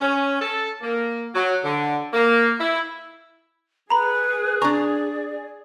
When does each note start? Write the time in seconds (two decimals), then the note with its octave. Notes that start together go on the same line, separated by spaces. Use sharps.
0.01 C#4
0.41 A4
0.82 A#3
1.34 F#3
1.64 D3
2.13 A#3
2.59 E4
3.90 G#4 B4 A#5 B5
4.62 D4 D5 A#5 C#6